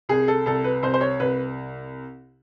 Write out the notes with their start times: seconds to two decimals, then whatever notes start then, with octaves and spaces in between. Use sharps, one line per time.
0.09 C2 G#4
0.28 A4
0.46 C2 A4
0.64 B4
0.82 C2 C5
0.94 C5
1.01 C#5
1.19 C2 B4